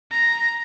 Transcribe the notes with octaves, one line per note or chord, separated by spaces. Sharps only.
A#5